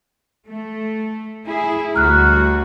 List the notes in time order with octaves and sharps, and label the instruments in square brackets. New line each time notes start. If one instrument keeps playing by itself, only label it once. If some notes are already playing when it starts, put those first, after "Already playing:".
[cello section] A3
E4 G#4
[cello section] D2 G3 F#4 [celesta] A#5 F6 F#6